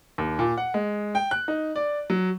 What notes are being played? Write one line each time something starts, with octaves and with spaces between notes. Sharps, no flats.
D#2
A#2
F#5
G#3
G5
F#6
D#4
D5
F#3